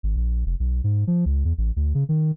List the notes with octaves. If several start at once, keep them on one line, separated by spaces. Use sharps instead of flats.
G#1
A#1
F1
B1
G#2
F3
C#2
E2
A1
D2
C#3
D#3